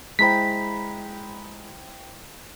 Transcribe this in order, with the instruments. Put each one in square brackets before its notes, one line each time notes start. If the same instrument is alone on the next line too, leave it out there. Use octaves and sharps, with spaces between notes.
[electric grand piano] G#3 A#5 B5 [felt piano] E4 C5 G5 [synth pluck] B6